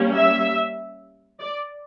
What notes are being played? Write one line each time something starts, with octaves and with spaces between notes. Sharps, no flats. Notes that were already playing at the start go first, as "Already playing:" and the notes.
Already playing: G3 A#3 C#4
E5
D5